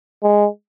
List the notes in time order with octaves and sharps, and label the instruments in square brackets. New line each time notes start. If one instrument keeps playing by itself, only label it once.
[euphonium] G#3